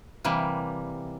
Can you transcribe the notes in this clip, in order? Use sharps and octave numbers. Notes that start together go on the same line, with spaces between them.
C3 E3 G3 A#3